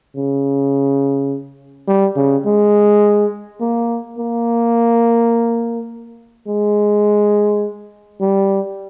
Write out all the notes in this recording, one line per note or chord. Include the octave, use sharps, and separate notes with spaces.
C#3
G3
C#3
G#3
A#3
A#3
G#3
G3